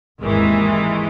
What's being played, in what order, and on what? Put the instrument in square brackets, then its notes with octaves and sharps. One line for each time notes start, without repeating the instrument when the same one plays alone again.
[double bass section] G#1 D#2 G#2 [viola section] D#3 E3 G#3